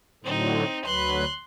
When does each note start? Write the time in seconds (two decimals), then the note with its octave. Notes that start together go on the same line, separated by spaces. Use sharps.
0.24 A2 D3 F#3 C4 D#4
0.85 D2 F#3 B4 C6 F#6